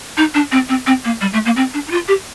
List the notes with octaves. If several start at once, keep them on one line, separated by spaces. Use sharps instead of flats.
D#4
D4
C4
C4
C4
A#3
G3
A3
A#3
C4
D4
D#4
F4
G4